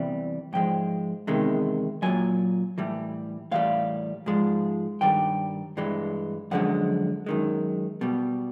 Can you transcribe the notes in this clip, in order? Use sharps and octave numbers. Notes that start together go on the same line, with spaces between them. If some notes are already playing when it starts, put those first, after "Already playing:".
Already playing: E2 C3 E3 G3
G#2 F3 G#3 G5
E2 C3 D#3 G#3
A#2 F#3 G#5
A2 E3 G3
A2 E3 G3 F5
G#2 F3 G#3
G2 D#3 G3 G5
G2 E3 G#3
F#2 D3 F3 G#3 F#5
F#2 D#3 G#3
B2 G3